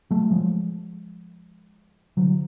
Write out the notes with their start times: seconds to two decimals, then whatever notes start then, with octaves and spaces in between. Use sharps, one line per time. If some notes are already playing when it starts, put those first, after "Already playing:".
0.11 F#3 A3
0.31 F3 G#3
2.17 D3 F#3